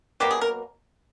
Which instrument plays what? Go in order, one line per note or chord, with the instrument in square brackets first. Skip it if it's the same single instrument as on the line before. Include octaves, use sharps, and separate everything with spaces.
[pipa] B2 F#3 A#3 G4
G#4
A#4